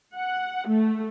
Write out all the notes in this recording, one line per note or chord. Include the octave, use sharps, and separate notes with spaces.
F#5
A3